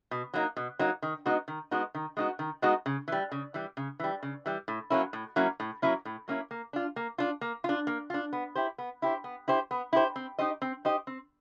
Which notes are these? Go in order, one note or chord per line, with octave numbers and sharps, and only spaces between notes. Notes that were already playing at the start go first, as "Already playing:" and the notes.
B2
F#3 A#3 D#4
B2
F#3 A#3 D#4
D#3
G#3 B3 D#4 F#4
D#3
G#3 B3 D#4 F#4
D#3
G#3 B3 D#4 F#4
D#3
G#3 B3 D#4 F#4
C#3
E3 G3
C#3
E3 G3
C#3
E3 G3
C#3
E3 G3
A2
F#3 A#3 C#4 E4
A2
F#3 A#3 C#4 E4
A2
F#3 A#3 C#4 E4
A2
F#3 A#3 C#4 E4
A#3
D4 F4
A#3
D4 F4
A#3
D4 F4
A#3
D4 F4
B3
E4 G4 C5
B3
E4 G4 C5
B3
E4 G4 C5
B3
E4 G4 C5
C4
D#4 G4 C5 D#5
C4
D#4 G4 C5 D#5
C4